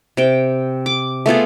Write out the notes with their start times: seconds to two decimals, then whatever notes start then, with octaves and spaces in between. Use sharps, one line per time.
0.17 C3 G5
0.86 D6
1.26 A3 B3 F4 G#4